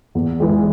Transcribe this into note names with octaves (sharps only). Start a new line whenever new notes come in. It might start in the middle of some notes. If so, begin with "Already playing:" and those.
E2
E3 G#3